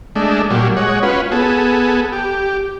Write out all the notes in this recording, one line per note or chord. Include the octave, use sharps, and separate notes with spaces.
G#3 A3 D4
A#2 F#3 G3
G#3 C#5 F#5
C#4 F4 F#4 B4
B3 G#4 A4
G4